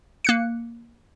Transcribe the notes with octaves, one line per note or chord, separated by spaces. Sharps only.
A#3 F#6 C#7